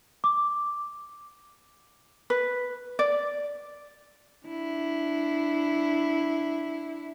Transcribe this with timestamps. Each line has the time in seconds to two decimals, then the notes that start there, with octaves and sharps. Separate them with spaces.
0.24 D6
2.30 B4
2.99 D5
4.46 D4 E4